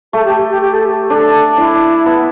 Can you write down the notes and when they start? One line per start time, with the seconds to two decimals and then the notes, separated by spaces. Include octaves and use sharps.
0.13 A3 A4
0.25 G4
0.49 G4
0.62 G4
0.74 A4
0.85 G4
1.09 D4 A4
1.57 D4 E4
2.06 B3